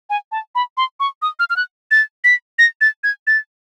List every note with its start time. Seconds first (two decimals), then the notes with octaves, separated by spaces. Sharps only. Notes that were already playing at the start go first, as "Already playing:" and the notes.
0.10 G#5
0.32 A5
0.55 B5
0.77 C6
1.00 C#6
1.22 D#6
1.39 F6
1.50 F6
1.56 F#6
1.91 A6
2.24 B6
2.59 A#6
2.81 A6
3.04 G#6
3.27 A6